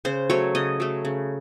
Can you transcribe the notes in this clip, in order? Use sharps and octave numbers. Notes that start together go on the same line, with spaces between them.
C#3 C5
F#3 A3 C#5
C#3 D#5
F#3 A3
C#3